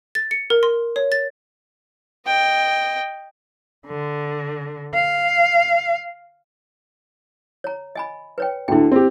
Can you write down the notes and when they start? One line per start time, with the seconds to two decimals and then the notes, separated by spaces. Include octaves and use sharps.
0.15 A6
0.31 C#7
0.50 A#4
0.63 C6
0.96 C#5
1.12 A6
2.27 D#5 G5
3.87 D3
4.94 F5
7.64 C#5 A#5
7.95 D#5 G#5 B5
8.38 B4 C#5 G5
8.68 D2 D3 E4 G5
8.92 C4 G4